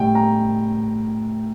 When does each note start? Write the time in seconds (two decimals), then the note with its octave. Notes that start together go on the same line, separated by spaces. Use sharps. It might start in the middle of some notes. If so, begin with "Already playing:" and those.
Already playing: A2 G3 G5
0.15 A#5